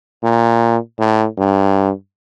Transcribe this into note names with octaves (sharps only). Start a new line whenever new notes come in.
A#2
A2
G2